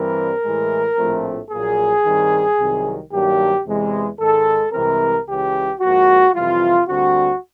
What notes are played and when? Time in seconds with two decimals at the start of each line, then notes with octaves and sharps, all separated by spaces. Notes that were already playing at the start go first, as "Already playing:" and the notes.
Already playing: G2 E3 G3 C4 A#4
0.43 A2 E3 G#3
0.97 A#1 A2 F3 A3 C4
1.51 A#1 A#2 F#3 A#3 G#4
2.04 G2 D#3 G3 C4
2.57 C2 C3 D#3 F#3
3.12 G2 D#3 F#3 A#3 G4
3.65 E2 C3 E3 G#3
4.19 G#2 D#3 G#3 A4
4.73 C2 C3 E3 G#3 C4 A#4
5.27 C#2 C#3 E3 G4
5.81 G#2 F3 A#3 F#4
6.34 F2 C3 E3 G3 F4
6.88 D2 D3 G3 C4 F#4